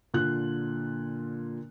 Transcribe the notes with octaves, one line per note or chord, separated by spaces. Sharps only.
A#2 D3 F4 F#6